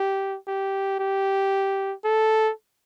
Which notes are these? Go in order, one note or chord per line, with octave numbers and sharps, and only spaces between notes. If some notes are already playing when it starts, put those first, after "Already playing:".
Already playing: G4
G4
G4
A4